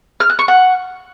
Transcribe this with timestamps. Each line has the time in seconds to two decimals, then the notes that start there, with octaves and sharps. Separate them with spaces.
0.20 F6
0.30 F#6
0.39 C#6
0.48 F#5